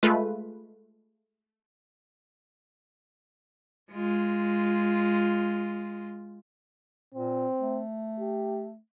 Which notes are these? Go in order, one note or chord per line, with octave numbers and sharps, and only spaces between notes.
G#3 A3 F4 B4
G#3 F4
A#2 C4
A3
G4